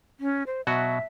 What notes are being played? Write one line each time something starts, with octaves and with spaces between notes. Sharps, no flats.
C#4
C5
B2 F#3 F#4 E5